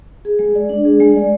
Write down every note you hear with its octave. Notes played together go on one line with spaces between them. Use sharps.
G#4
G#3
D5
D4
G#4
G#3
D5